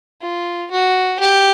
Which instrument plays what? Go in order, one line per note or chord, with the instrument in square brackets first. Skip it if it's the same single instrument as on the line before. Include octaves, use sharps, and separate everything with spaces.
[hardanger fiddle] F4
F#4
G4